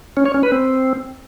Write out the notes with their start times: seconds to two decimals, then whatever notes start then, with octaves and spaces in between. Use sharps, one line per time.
0.17 C#4
0.26 C#5
0.34 C#4
0.43 B4
0.52 C4